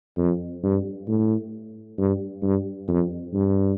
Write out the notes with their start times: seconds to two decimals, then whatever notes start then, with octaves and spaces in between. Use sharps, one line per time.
0.18 F2
0.63 G2
1.08 A2
1.98 G2
2.43 G2
2.88 F2
3.34 G2